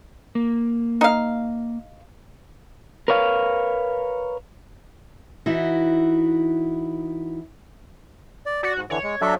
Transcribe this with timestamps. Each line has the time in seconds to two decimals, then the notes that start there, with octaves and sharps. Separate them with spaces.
0.35 A#3
1.01 D#4 F5
3.08 A#4 B4 C#5 F5
5.46 E3 D#4 E4 F#4
8.46 D5
8.63 F#4 D5
8.76 G#2
8.90 D3 E3 C#5
9.03 G#3
9.22 F#3 D4 A4 E5